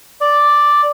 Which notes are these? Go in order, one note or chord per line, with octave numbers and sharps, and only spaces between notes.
D5